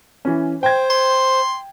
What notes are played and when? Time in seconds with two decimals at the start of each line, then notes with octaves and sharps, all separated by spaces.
0.25 E3 C#4
0.63 C5 G5 G#6
0.90 C6